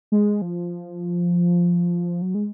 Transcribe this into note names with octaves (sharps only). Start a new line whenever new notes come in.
G#3
F3
F#3
G#3